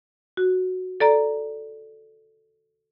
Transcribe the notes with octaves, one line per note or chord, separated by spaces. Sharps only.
F#4
A4 D5 A#5